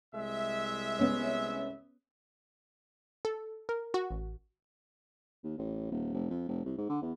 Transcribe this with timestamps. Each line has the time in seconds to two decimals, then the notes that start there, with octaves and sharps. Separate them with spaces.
0.14 C2 G#3 E5
0.99 B3 C#4
3.25 A4
3.69 A#4
3.94 F#4
4.11 A1
5.43 D#2
5.58 A1
5.91 D#1
6.14 F1
6.30 F2
6.48 F1
6.65 C2
6.78 G#2
6.89 D3
7.01 E2